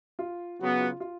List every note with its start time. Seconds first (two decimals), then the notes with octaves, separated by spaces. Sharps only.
0.19 F4
0.59 C#3 F#3 B3 F#4
0.80 F4
1.00 F4